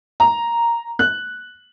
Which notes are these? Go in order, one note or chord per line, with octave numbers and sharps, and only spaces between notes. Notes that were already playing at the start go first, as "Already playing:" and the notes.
A#5
F#6